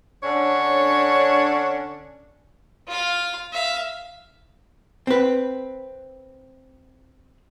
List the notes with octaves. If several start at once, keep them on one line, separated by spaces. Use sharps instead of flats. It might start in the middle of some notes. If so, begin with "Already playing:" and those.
D3 C#4 D4 C#5
F4 F5
E5 F5
C4 B4